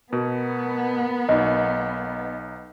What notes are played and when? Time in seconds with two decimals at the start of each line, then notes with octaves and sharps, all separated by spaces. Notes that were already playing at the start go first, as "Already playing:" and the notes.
0.13 B2 B3 A#4
1.29 B1 D#4 D#5